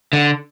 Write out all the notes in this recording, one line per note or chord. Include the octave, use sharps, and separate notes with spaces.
D3